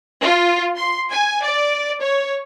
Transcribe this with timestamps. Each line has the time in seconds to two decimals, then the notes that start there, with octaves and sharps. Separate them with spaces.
0.23 F4
0.77 C6
1.11 G#5
1.43 D5
2.01 C#5